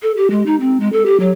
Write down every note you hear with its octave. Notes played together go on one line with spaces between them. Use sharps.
A4
G4
G#3
D#4
C4
G#3
A4
G4
F#3